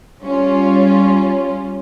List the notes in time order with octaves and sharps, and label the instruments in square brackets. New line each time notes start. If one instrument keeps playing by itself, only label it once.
[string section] G3 C#4 F4